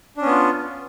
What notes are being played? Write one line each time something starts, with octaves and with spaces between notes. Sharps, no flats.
B3 C#4 D4 F4